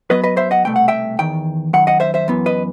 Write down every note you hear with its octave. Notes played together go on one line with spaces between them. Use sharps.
F#2 F#3 B3 B4 D#5
B4 D#5
C5 E5
D#5 F#5
C2 B2 A3 G5
F#5
E5 G5
E2 D#3 G5
F#2 D#3 F#5
D#5 F#5
C5 E5
C5 E5
F#2 E3 B3
B4 D#5